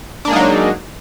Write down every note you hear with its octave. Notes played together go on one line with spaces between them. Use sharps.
F#3 G#3 A#3 D4 D#4